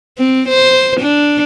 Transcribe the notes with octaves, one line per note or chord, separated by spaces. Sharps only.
C4
C5
D4